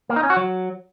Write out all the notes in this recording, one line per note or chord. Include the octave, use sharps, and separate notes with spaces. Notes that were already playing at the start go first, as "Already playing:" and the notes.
A#3
D#4
C#4
F#4
F#3